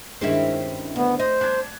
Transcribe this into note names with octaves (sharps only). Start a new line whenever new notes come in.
G2 D#3 G#3 C4 C#4 E4
D2 B3
C5 D#5
D4 F#6 G#6